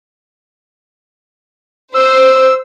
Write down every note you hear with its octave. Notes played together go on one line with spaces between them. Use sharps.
C5 E6